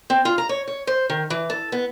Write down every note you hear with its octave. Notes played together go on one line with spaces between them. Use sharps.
C4
F4
A#5
C#5
C#5
C5
D#3
E3
A4
B3